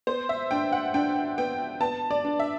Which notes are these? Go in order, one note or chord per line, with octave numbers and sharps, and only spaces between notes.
B3 C5
E5
D4 G5
F#5
D4 G5
B3 G5
B3 A5
D5
D4
E5